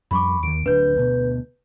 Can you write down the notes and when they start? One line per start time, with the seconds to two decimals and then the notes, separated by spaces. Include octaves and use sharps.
0.11 F2 G3 B5 C#6 D6
0.43 D#2 D#3 D7
0.66 D1 C4 D4 B4 G6
0.95 D2 B2